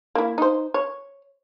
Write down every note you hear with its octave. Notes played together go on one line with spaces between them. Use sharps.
A#3 E4
D#4 C5
C#5